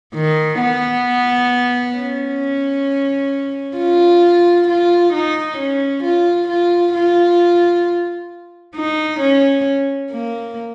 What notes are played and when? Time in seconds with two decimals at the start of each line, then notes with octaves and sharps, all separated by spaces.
0.14 D#3
0.60 B3
1.95 C#4
3.77 F4
4.68 F4
5.13 D#4
5.57 C#4
6.03 F4
6.49 F4
6.94 F4
8.76 D#4
9.20 C#4
10.11 A#3